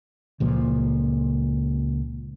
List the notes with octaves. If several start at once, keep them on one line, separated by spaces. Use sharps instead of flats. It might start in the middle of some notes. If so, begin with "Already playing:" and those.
C#2 A#2 F3